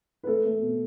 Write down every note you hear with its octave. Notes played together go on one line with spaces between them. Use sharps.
B4
A3 A4
A3
B2